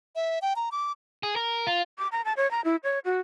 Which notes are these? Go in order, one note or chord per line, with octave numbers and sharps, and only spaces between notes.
E5
G5
A#5
D6
G#4
A#4
F4
D6
A#5
A5
C#5
A#5
E4
C#5
F#4